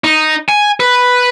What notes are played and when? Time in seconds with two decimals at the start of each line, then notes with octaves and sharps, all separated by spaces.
0.04 D#4
0.49 G#5
0.80 B4